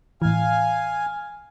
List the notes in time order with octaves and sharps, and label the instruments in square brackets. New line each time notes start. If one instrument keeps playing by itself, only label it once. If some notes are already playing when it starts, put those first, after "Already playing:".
[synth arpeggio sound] A2 E3 [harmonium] F5 G#5